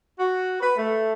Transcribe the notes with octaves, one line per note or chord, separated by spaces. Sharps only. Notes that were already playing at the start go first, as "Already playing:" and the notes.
F#4
B4
A3